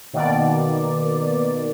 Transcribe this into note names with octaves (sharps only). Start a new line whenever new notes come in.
B2 D#3 A#3 D5